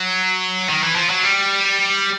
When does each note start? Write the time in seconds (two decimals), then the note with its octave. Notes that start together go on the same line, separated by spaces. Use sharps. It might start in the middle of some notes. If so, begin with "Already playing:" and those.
Already playing: F#3
0.70 D#3
0.84 E3
0.96 F3
1.11 F#3
1.24 G3